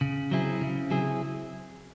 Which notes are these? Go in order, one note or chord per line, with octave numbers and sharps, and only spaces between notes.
C#3
F#3 C4 E4 G#4
C#3
F#3 C4 E4 G#4